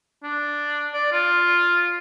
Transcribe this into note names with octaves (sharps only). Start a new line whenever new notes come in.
D4
D5
F4